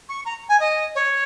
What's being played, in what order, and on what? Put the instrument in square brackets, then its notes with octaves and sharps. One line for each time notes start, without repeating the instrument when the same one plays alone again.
[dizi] C#6
A#5
G#5
D#5
C#5